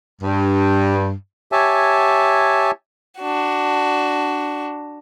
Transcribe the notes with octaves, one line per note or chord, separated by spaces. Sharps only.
G2
G4 C#5 E5 G#5 A5
D4 F#4